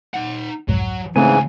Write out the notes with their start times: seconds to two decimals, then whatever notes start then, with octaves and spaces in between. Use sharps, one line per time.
0.14 D#4 F#5
0.68 C2 F2 G#2 F#3
1.16 C#2 G#2 C#3 E3 A3 C4 G#5